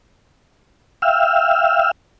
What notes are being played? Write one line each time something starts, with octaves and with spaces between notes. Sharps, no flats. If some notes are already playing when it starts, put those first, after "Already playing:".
E5 F5 G5 E6 F6